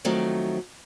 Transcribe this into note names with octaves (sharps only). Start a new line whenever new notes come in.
D#3 F3 F#3 A3 C4